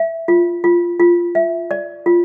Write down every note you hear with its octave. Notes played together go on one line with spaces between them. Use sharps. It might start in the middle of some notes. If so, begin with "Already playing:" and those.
Already playing: E5
F4
F4
F4
E5
D5
F4